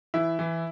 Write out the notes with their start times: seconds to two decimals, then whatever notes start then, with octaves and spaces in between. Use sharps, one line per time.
0.14 E3 E4 E5
0.39 E3